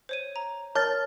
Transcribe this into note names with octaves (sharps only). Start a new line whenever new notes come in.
C5 C#5 D#7
A#5
A#4 C#5 A5 F6 A6